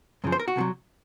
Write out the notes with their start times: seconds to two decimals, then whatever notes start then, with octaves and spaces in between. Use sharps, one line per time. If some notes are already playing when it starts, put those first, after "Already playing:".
0.24 F#2 C#3 F3
0.32 C5
0.40 A#4
0.48 F#4
0.56 C2 C3 D#3 F#3